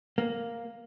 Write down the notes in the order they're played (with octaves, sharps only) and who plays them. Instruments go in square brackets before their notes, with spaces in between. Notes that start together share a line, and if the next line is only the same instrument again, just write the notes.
[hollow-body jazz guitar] A#3